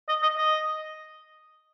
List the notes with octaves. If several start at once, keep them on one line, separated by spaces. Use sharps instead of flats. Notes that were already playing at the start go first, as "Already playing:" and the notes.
D#5
D#5
D#5